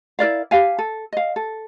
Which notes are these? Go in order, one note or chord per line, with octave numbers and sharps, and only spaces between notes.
E4 A#4 D5 F5
G4 F5 G#5
A4
D#5 F5
A4